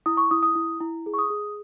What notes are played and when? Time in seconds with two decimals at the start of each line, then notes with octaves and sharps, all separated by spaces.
0.06 E4 D#6
0.17 C#6
0.31 E4 D#6
0.43 D#6
0.55 E4
0.80 E4
1.06 G#4
1.14 C#6
1.18 D#6
1.30 G#4